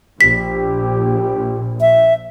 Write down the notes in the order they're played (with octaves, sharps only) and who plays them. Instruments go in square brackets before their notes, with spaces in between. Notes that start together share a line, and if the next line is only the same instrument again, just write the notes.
[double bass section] A#1 [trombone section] G4 [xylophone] B6
[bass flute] E5